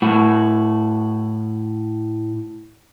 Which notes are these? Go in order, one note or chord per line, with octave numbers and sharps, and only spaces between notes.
A2 F#4